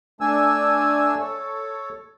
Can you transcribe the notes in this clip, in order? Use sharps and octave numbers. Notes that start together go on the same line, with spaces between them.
A3 D4 G#5 E6
A4 C#5